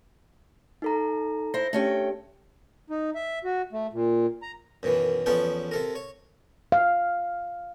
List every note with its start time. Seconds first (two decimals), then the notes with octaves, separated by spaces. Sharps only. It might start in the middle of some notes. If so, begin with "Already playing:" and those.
0.82 D#4 A4 A#5
1.54 E4 C5 A#6
1.73 A3 C#4 D4 G4 G5
2.90 D#4
3.15 E5
3.45 F#4
3.73 A3
3.93 A#2
4.42 A#5
4.83 F#2 B2 D#3 E3
5.26 E2 F3 B3 C#4 A4 G5
5.71 C3 A4 A#4
5.95 C#5
6.72 F5